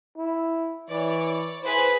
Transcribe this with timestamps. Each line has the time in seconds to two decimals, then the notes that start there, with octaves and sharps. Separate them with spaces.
0.17 E4
0.90 E3 C#5 D5
1.63 E4 G#4 B4 C5